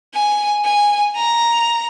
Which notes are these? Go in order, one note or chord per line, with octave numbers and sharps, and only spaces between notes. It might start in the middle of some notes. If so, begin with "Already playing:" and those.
G#5
G#5
A#5